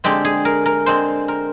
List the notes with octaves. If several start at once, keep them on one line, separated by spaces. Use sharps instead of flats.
D3 G#3 C4 G4
G#4
A#4
A#4
D3 G#3 C4 C5
A#4